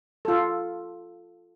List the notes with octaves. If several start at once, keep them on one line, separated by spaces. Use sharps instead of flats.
F4 A4